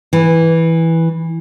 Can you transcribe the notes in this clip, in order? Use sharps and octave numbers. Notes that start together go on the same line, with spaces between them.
E3